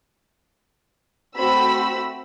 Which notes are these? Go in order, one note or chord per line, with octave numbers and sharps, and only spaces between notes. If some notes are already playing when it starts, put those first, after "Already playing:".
A3 C4 F#4 B5 E6